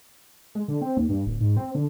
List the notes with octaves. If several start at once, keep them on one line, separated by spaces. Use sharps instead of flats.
G#3
D3
C4
D#2
G2
D1
G#2
C4
D3